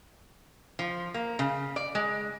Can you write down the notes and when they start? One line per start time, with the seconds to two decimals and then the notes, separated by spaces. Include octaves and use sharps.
0.79 F3
1.14 A#3
1.39 C#3
1.76 D5
1.95 G#3